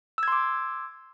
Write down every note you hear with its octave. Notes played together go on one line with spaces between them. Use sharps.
C6 D6 E6 G#6